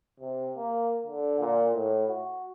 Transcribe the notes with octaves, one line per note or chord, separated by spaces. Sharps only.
C3
A#3
D3
A#2
A2
F#4